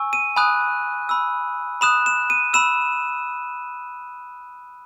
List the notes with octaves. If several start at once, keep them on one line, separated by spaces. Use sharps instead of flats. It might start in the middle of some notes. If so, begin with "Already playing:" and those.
Already playing: G#5 C#6 E6
D#7
G#5 B5 D#6 F#6
B5 E6
B5 D#6 F#6 E7
E7
D#7
B5 E6 E7